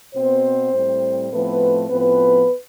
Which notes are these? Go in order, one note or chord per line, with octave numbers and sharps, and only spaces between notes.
B2 B3 C4 C5
A2 G3 C4
A2 F3 A3 B3 C4 B4
A2 F3 B3 C4 B4